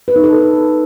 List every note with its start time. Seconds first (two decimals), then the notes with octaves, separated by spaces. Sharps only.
0.08 B4
0.16 D#4
0.24 A4